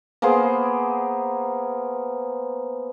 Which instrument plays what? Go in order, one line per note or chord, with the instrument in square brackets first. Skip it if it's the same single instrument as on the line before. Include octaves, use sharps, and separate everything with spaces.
[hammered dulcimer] A#3 B3 G#4 C5